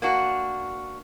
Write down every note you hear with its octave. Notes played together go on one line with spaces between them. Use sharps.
A#3 D4 F#4